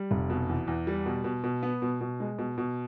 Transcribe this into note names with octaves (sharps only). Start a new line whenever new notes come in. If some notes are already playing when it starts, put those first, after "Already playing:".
Already playing: G3
F1
B2
E2
E2
G3
B2
B2
B2
B3
B2
B2
G#3
B2
B2